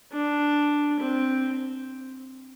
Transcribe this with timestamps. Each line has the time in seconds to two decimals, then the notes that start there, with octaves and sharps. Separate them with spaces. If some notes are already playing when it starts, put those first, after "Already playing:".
0.13 D4
1.00 C4